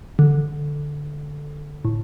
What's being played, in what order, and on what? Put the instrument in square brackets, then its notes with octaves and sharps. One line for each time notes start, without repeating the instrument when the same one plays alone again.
[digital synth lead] D3
A2